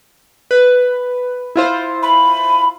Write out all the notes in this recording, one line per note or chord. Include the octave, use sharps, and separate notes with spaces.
B4
E4 F4 C5
B5